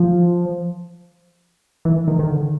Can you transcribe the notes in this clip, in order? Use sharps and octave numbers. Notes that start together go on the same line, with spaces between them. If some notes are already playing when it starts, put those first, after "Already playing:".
Already playing: F3
E3
D#3
D#3
D3